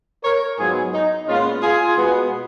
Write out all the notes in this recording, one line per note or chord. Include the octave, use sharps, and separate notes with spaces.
A#4 C#5
G#2 F#3 B3 F4 G#4
D#4
A#2 G#3 B3 C#4 F4
F4 G#4
B2 G#3 B3